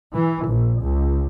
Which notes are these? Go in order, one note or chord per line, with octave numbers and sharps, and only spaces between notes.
E3
A#1
C#2